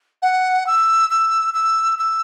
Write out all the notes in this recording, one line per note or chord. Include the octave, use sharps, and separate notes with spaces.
F#5
E6
E6
E6
E6